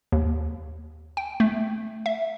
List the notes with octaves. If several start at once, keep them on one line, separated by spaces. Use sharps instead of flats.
D#2
G5
A3
E5